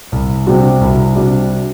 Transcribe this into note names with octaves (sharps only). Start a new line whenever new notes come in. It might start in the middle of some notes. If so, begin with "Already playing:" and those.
C2
C3 G3 D4 F#4
C2
C3 G3 D4 F#4